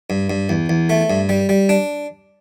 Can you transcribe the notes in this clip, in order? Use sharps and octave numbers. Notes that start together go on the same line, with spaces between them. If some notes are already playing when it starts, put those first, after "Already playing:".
G2
G2
E2
E2
A3
G2
G3
G3
D4